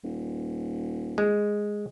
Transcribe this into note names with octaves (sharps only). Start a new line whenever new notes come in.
D#1
G#3